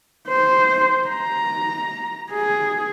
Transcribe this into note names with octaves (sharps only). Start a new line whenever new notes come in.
C5
A#5
G#4